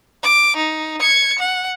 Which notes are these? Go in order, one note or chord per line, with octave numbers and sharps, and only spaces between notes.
D6
D#4
G#6 C#7
F#5